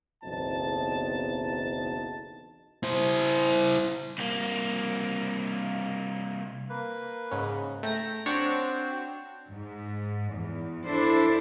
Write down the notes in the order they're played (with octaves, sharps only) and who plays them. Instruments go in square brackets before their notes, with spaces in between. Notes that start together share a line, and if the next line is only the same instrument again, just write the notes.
[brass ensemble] F#1 B1 E2 C4 D#4 A5
[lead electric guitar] E4 C5
[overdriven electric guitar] C2 A#3
[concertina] A#3 B4
[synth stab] G#2 C#3
[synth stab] A3 A#6 [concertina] G5 A#5
[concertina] C4 F#4 C5 [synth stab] D4 C#5
[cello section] G#2
E2
D4 E4 A4 C5